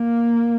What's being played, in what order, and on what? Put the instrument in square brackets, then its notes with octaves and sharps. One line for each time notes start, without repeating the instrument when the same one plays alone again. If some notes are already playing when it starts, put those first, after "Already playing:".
Already playing: [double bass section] A#3